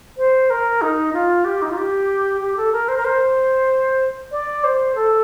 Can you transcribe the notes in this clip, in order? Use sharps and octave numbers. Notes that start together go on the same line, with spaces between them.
C5
A#4
D#4
F4
G4
D#4
F4
G4
G4
A4
A#4
C5
A#4
C5
D5
C5
A4